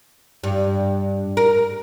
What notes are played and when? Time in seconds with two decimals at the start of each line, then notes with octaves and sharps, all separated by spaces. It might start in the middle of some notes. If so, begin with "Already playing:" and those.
0.43 G2
1.37 A#4